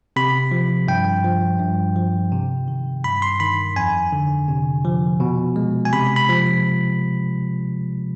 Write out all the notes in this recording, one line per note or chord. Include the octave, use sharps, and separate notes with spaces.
C3 B5
F3
G2 G5
F3
G2
F3
C3
D#3
G2 B5
C6
D#3 B5
F2 G#5
D3
C3
F3
B2
G#3
G#5
C3 B5
B5
F3